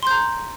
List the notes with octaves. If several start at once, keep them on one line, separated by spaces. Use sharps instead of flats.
A#5 C6 G6